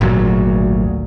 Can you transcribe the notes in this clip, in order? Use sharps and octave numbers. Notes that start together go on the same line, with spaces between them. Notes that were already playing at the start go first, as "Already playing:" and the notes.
G#1 D2 A#2 F#3